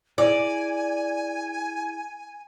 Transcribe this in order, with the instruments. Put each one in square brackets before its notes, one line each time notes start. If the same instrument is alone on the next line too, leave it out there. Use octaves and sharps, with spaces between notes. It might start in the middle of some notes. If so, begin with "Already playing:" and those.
[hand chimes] E4 G#4 [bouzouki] D5 [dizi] G#5